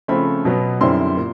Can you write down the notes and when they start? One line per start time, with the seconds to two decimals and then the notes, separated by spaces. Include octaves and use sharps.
0.08 C#3 F3 A3 C4 B5
0.45 B2 F#3 B3
0.81 F#2 D3 G3 C4 E4 C6
1.17 A#2